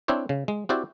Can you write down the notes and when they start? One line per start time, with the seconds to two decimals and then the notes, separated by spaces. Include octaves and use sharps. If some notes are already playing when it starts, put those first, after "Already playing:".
0.08 C4 D4 E4 C5 C#5
0.29 C#3
0.48 G#3
0.69 C4 E4 F#4 G4 C5 D5